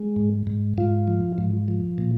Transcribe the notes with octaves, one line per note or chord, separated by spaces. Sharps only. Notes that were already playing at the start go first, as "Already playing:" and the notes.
Already playing: G#3
G#2
G#2
G#2 F4
F3
G#2
F3
A#2